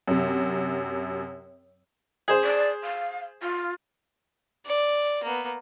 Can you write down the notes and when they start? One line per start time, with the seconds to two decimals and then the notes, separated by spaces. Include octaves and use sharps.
0.07 F#2 C3
2.28 G#4 C5
2.43 D5
2.83 F5
3.42 F4
4.66 D5
5.23 A#3 B3